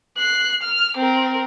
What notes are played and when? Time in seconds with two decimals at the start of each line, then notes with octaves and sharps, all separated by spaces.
0.18 F#6 C7
0.62 F6
0.97 C4 A#4